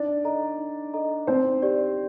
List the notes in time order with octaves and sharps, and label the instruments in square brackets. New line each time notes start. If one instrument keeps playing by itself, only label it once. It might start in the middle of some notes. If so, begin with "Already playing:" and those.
Already playing: [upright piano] D4 D5 [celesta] D#4
[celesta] A4 D#5 A#5
D#4
A4 D#5 A#5
[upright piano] C4 C5 [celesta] D#4
[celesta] G4 D5